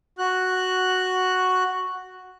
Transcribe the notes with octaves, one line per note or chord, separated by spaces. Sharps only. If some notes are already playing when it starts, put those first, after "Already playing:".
F#4 F#6